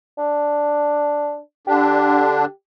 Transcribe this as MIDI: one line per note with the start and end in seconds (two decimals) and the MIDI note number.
0.18 1.38 62
1.67 2.45 50
1.67 2.45 62
1.67 2.50 67